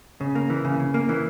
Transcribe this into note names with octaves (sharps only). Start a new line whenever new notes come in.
C#3
A#3
E3
C#3
C#3
A#3
E3